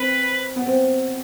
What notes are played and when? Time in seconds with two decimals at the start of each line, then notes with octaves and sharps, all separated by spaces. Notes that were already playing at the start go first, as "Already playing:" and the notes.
Already playing: C4 B4
0.56 B3
0.66 C4